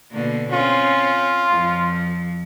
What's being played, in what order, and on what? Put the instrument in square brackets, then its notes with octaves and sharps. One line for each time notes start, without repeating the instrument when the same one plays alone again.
[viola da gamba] B2 D3 A#3
[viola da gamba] C4 C#4 [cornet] F4
[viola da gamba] F2 F3